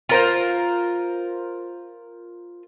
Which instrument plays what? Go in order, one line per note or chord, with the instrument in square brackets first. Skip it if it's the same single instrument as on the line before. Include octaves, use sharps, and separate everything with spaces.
[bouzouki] F4 A#4 C5